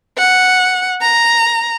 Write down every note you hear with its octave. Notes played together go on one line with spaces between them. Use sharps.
F#5
A#5